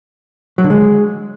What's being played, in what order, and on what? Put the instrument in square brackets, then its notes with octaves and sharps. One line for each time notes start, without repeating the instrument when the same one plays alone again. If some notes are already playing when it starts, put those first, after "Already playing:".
[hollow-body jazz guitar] F#3
D3
G#3